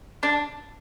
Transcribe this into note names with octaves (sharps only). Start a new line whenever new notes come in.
D4